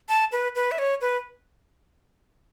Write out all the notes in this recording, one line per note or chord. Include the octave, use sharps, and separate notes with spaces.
A5
B4
B4
E5
C#5
B4